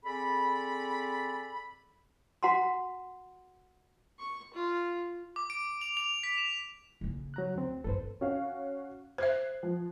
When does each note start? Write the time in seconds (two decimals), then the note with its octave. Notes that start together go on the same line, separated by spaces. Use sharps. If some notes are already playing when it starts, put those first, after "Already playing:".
0.04 C4 G#4 A4 D5 B5
2.43 F#4 F#5 A#5 C6
4.19 C#6
4.54 F4
5.36 D6
5.50 D7
5.81 F7
5.97 F7
6.23 B6
6.38 E7
7.01 C#3 A#3
7.34 F#3 A#5 F#6
7.55 D2 C4
7.84 G1 D2 A4 B4 C5
8.21 C#4 F#4 F5
9.18 C5 E5 F#6 G#6 C7
9.63 F3